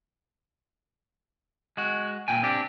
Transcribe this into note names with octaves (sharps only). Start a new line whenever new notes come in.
G#3 F#4
A#2 G5 G#5
C4 D4 G4